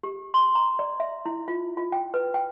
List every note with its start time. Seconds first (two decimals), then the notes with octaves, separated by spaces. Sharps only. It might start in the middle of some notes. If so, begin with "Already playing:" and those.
0.03 G4
0.34 C6
0.55 A#5
0.79 D5
1.00 E5
1.26 E4
1.48 F4
1.77 F4
1.92 G5
2.14 B4
2.34 G5